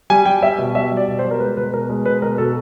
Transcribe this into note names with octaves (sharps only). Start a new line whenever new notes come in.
G3 G#5
G3 G5
G3 E5
B2
G3 E5
G3
D5
B2
C5
G3
A#4
G#3 B4
B2 B4
B2 A#4
G#3 A#4
B2 B4
B2 A#4
B2 A4